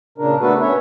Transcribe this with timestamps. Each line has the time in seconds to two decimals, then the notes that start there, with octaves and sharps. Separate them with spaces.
0.18 A#2 C#3 D4 A#4
0.41 A3 B3 D4 F#4 A4 B4
0.61 C#4 C#5 E5